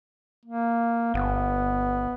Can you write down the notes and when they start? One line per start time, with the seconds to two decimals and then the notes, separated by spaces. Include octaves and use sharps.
0.46 A#3
1.14 G1 B3